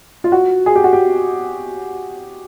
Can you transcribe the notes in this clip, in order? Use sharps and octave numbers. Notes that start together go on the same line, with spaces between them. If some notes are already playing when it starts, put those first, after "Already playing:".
F4
F#4
G#4
G4
F#4
G4